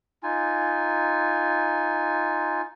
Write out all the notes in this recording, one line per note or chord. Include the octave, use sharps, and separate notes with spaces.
D#4 F4 G#5